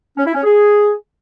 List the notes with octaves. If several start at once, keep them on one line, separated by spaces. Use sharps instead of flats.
C#4
E4
C#4
G#4